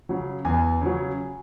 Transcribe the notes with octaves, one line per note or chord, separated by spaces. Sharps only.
C#3 F#3
E2 G#5
C#3 F#3